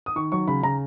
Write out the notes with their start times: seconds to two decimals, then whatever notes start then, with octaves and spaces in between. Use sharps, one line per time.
0.06 D#6
0.16 D#3 C#6
0.32 F#3 C#6
0.48 C#3 B5
0.63 C#3 A#5